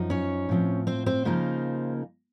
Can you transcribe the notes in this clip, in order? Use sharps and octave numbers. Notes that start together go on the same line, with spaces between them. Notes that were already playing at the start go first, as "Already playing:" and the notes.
Already playing: F#2 F3 D#4
C#4 C#5
A2 F3 C4
C4 C5
C4 C5
C#3 F3 A#3 D#4